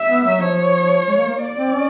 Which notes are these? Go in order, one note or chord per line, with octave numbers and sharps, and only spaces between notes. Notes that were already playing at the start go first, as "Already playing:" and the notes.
Already playing: E5
B3
F#3
F3 C#5
G#3
A#3
A#3
D5
C4
C#4